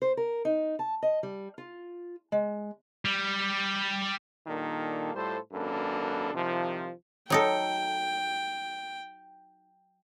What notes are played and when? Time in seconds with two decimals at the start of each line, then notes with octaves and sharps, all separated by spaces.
0.02 C5
0.17 A#4
0.45 D#4
0.79 A5
1.02 D#5
1.23 G3
1.58 F4
2.32 G#3
3.05 G3
4.47 A#2 D#3 G3 A#3 D4 A4
5.15 A2 G3 F4 A4 C5
5.52 G#1 F#2 A#3 D4 A4 B4
6.34 C2 C3 D#3 F3
7.30 F#3 D#4 A4 G5